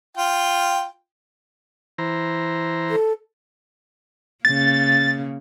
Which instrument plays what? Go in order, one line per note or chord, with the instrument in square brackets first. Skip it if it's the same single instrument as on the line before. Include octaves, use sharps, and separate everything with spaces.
[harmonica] F4 G5
[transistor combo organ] E3 C5 A#5
[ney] A4
[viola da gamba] C#3 A#3 [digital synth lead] A6